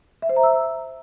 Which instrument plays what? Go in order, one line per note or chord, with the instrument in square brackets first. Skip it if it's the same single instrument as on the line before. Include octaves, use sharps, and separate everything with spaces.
[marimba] E5
C5
A#5
E6